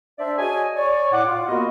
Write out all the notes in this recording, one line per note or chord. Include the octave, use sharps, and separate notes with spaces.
D4 C5 D5 E5
F#4 G#4 C#5 D#5 G#5
C#5 D5
A2 F#5 D6
F4
A#3 B3 F#4 G4 A#4 D#5